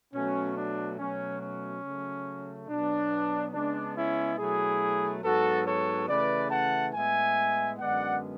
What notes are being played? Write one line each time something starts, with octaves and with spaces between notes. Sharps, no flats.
B2 F#3 A3 C#4
D4
B2 F#3 A3 C#4
C#4
C#3 F#3 A3
B2 F#3 B3 D4
C#3 G#3 B3 D4
C#4 E4
B2 F#3 A3 E4 G#4
G#2 F#3 B3 F#4 A4
A4 C#5
C#3 E3 A3 B4 D5
F#5 A5
A2 G#3 B3 E5 G#5
F#2 D3 G#3 B3 D5 F#5